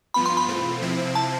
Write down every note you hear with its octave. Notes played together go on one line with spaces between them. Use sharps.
G2 F3 B3 F4 B5
C6
B5
E2 B2 A3 C4 F4
C3 F3 C4 E4
A5